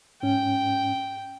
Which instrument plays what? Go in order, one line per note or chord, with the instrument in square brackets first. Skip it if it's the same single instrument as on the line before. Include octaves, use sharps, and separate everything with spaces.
[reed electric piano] G#2 C#4 [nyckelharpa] G5